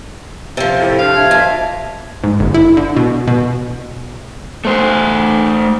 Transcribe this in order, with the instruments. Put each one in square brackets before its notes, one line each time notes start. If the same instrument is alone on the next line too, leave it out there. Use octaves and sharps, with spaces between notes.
[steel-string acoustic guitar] C3 F3
[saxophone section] A2 [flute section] A4
[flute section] D4 C5 [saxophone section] F5
[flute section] E5 A5 G#6
[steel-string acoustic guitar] F2
[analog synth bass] G#2
G1
E4
D3
B2
B2
[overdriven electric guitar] A3 C5